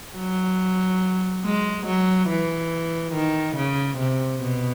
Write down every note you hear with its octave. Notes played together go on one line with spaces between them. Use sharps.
F#3
G#3
F#3
E3
D#3
C#3
C3
B2